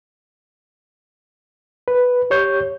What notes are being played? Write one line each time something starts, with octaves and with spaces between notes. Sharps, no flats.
B4
G4 C#5 G6